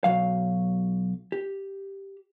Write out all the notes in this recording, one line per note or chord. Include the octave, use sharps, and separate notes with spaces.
B1 F#3 F5
G4